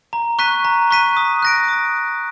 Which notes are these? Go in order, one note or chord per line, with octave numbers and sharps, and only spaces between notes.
A#5
C#6 F#6 B6 D#7
A#5
C#6 F#6 B6 D#7
D#6
F#6 A#6 D7
D#6